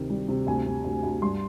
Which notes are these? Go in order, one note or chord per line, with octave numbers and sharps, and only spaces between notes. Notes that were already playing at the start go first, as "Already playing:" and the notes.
Already playing: D2 C3 D#3
G3
C3
D2 G#5
C3
D2
D2
G2 C6